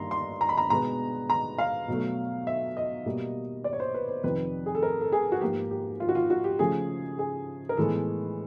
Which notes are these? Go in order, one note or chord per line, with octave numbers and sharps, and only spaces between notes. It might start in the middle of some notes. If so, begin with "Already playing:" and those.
Already playing: G2 D#3 G3 A#3 A#5 C6
C6
A#5
B5
A#5
B2 G#3 B3 A#5
A#5
F5
B2 F#3 A3
E5
D#5
B2 G3 A#3
D5
C#5
C5
B4
C5
F2 C3 D#3 B4
G#4
A4
A#4
A4
G#4
F#4
G#2 F3 A#3 G4
G4
F4
F#4
F4
F#4
G4
C#3 F3 A3 G#4
G#4
A#4
A2 E3 G#3 B3 A4